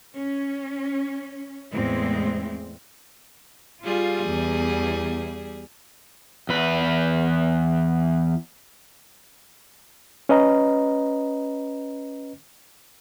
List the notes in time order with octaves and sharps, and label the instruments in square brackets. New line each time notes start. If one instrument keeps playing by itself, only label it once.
[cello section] C#4
E2 A2 G#3 C4
[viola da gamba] G3 G#4 [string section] F4
[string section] E2
[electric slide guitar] E2 B4
[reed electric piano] C#4 B4 D#5 A#5